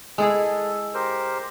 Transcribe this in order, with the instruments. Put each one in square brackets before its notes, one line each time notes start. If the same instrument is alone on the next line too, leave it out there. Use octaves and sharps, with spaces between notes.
[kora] G#3 E4 G#4 [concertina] A4
[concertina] G4 A#4 C5